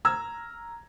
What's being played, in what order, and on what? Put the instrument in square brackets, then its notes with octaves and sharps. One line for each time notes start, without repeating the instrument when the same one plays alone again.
[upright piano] A#5 E6 F6 G#6